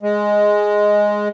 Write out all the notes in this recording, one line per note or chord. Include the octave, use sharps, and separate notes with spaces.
G#3